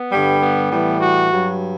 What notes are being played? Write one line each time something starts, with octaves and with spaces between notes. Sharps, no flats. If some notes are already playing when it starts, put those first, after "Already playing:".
Already playing: B3
G2 D3 G3
B3
A2 E3 G3
F#4
G2 F#3